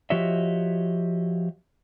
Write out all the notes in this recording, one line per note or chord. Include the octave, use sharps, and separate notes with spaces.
F3 F#4 G4 C#5 D#5 E5